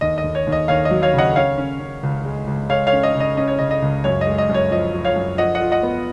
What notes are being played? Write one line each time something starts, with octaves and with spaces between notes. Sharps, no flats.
D#2 D#5
D#5
D#2
C#5
D#2
D#5
D#2 C#5 F5
D#5
F#3
C#5 F5
C#3 D#5 F#5
C#4 C#5 F5
C#4
C#4
C#2
G#3
C#2
G#3 C#5 F5
C#5 F5
C#4
D#5
C#3
D#5
C#4 D#5
C#5
C#3 D#5
D#5
C#2
F#2 C#5
D#5
G#3
D#5
F#2 C#5
F3 D#5
F3
C#5 F5
F#2
F3 D#5 F#5
D#5 F#5
F4
D#5 F#5
B3